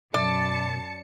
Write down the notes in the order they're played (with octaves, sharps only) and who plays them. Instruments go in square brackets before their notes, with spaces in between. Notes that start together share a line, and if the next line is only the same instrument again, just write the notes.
[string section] F#2 C#7 [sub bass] B2 [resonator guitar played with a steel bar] D5 [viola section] A5